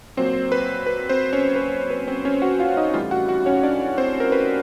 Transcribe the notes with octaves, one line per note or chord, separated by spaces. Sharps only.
A#2 F#3 C4 C5
B4
B4
C4 C5
C#4 C#5
B4
B4
C4 C5
C#4 C#5
F#4 F#5
F4 F5
D#4 D#5
A2 E3 G3 F4 F5
F#4 F#5
F#4 F#5
C#4 C#5
D4 D5
C4 C5
A#4
B4